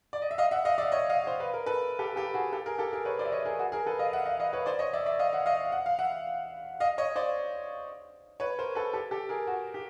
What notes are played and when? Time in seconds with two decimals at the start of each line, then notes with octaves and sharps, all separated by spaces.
0.13 D5
0.22 D#5
0.31 E5
0.38 D#5 F5
0.51 E5 F#5
0.65 D#5 F5
0.78 D5 E5
0.92 C#5 D#5
1.10 D#5 F5
1.27 C5
1.40 B4
1.54 A#4
1.66 A4 B4
1.99 G4 A4
2.16 G4 A4
2.34 F#4 G#4
2.52 G4 A4
2.66 G#4 A#4
2.78 G4 A4
2.92 G#4 A#4
3.05 B4 C#5
3.19 C5 D5
3.25 E5
3.32 C#5 D#5
3.45 G#4 A#4
3.59 F#4 G#4
3.72 G#4 A#4
3.87 A4 B4
3.99 D#5 F5
4.13 E5 F#5
4.25 D#5 F5
4.39 D#5 F5
4.53 B4 C#5
4.66 C5 D5
4.79 C#5 D#5
4.93 D5 E5
5.06 D5 E5
5.19 D#5 F5
5.33 E5 F#5
5.46 D#5 F5
5.72 F#5
5.86 F5
5.99 E5 F#5
6.80 D#5 F5
6.98 C#5 D#5
7.16 C5 D5
8.40 B4 C#5
8.59 A#4 C5
8.75 A4 B4
8.94 G4 A4
9.11 G4 A4
9.29 G#4 A#4
9.47 F#4 G#4
9.74 G4